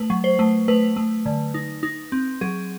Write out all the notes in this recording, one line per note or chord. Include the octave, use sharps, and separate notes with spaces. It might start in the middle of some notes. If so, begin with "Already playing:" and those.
Already playing: A3 B4
F#3
C5
A3
A3 B4
A3
D3
D#4
D#4
C4
F#3 G#4